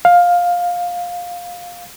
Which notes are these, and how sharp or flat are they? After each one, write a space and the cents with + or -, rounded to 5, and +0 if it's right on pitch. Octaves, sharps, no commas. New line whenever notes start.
F5 +15